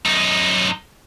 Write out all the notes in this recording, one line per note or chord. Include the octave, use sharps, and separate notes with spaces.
F#2 D#4